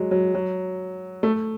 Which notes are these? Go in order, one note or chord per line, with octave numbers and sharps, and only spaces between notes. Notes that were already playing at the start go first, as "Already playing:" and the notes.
Already playing: F#3 G#3
F#3
F#3
A3